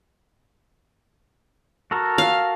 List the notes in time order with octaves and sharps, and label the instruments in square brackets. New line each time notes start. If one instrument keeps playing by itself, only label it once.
[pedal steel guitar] F#4 A4 A#4
[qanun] F5